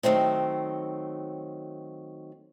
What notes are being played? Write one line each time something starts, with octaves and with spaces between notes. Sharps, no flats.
D#3 F#3 A3 C4